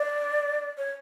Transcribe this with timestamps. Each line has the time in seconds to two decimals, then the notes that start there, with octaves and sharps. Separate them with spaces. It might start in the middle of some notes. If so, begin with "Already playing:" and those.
Already playing: D5
0.78 C#5